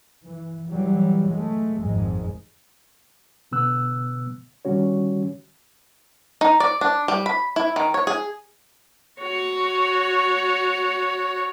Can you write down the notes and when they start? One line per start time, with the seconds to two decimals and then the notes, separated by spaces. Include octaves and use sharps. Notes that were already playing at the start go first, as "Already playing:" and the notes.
0.24 E3
0.69 E3 F#3 G3
1.29 G#3 A3
1.81 G#1 F2 G#2 G#3
3.52 B2 D3 B3 E6 F#6
4.65 D3 D#3 G3 C#4 F#4 C#5
6.41 D#4
6.60 D5
6.81 D4
7.08 G3
7.26 B5
7.56 E4
7.76 D#3
7.94 C#5
8.07 G#4
9.21 F#4 C#5